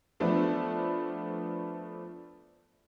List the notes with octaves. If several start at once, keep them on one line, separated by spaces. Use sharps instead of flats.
F3 A3 B3 D4